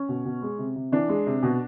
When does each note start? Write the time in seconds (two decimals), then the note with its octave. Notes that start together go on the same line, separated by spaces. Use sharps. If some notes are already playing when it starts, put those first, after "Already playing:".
Already playing: C#4
0.09 B2
0.25 B2
0.42 G#3
0.59 C3
0.76 C3
0.92 E3 D4
1.09 G#3
1.27 C3
1.43 B2